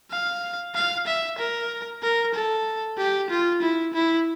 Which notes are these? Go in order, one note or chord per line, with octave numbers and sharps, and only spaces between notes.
F5
F5
E5
A#4
A#4
A4
G4
F4
E4
E4